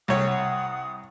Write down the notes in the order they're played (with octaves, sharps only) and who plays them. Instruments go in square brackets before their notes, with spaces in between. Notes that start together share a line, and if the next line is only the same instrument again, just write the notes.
[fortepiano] C2 C#5 [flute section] F#5 D#6